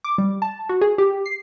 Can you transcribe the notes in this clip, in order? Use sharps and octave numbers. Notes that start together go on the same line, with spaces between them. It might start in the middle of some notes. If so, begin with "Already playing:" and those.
D6
G3
A5
F#4
G#4
G4
C7